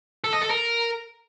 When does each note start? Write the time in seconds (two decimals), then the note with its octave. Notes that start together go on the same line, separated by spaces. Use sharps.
0.24 A4
0.33 D#5
0.41 A4
0.50 A#4